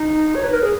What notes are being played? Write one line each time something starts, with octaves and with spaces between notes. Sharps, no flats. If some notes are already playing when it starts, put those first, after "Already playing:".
Already playing: D#4
C#5
B4
A#4
G#4